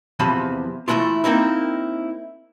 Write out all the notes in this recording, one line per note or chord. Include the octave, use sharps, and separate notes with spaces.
E2 C3 F3 A5 B5
E3 A3 C#4 D4 E4 F4
A#3 C4 D#4 E4